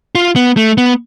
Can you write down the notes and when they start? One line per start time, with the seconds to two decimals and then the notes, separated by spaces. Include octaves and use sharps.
0.15 F4
0.36 B3
0.57 A3
0.78 B3